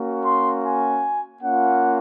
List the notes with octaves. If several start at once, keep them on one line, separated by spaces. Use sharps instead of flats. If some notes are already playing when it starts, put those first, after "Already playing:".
Already playing: A#3 C#4 F#4
C6
G#5
A#3 C#4 F4 F#5